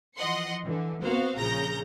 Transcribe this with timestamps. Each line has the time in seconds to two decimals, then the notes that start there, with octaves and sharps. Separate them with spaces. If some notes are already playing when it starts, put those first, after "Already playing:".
0.17 E3 F3 D#5 F#5 C6 C#7
0.64 D3 E3
1.02 B3 C4 F#4 C5 F5
1.37 A#1 A#2 C#3 A#5 G6 A#6